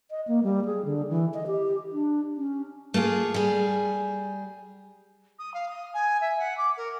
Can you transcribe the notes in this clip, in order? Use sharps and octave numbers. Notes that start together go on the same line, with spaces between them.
D#5
A#3
G3
G#4
D3
E3
D#5
G4
D4
C#4
A3 A#3 F4 G#4
G3 G#4
D#6
F5
D#6
G#5
E5
F#5
D6
A#4